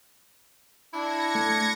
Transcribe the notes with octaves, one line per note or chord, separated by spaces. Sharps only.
D4 E4 G#6 A#6 C#7
A3